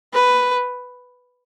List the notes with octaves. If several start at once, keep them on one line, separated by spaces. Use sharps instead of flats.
B4